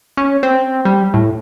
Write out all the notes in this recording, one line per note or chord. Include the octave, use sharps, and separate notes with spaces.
C#4
C4
G3
A2